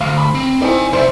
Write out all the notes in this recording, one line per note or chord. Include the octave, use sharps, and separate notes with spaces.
D2 F5
B5
C4
C4 D#4 E4 D5 G#5
C2 C5 D5 E5